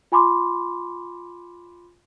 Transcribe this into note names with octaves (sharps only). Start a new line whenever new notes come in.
F4 G#5 B5 C6 D6